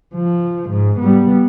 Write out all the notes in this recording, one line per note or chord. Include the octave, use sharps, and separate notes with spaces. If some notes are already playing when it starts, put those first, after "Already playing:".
F3
G#2
G3 B3